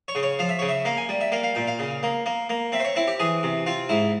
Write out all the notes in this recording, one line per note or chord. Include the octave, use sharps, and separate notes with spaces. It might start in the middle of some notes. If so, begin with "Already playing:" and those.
C#5
C#3
C#5
F3 F5
E5
C#3 C#5
E5
A#3 F5
G#5
G3
E5
A#3 F5
F5
A#2 G5
F5
C#3
A#3
A#3
A#3
C4 E5
C5
C#5
C4 E4
G4
E3 G#4
C3
C4 F4
G#2 E4